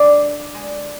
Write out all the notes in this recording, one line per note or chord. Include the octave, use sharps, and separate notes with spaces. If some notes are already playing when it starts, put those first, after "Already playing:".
Already playing: D3 G#3 D4 D5
D3 G#3